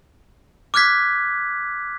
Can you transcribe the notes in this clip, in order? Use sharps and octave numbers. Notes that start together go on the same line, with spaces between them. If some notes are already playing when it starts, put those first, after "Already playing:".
D6 F6 F#6 G#6 B6